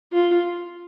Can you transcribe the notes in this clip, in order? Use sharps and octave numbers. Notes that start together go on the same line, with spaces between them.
F4